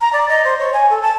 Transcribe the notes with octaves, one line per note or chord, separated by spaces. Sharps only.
A#5
D5
D#5
C5
C#5
G#5
A4
A5